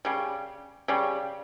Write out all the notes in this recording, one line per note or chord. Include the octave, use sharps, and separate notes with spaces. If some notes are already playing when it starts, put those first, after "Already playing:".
C#3 G3
C#3 G3